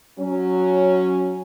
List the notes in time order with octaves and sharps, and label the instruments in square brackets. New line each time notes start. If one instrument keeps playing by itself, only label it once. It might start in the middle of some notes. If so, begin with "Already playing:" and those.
[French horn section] F#3 C#4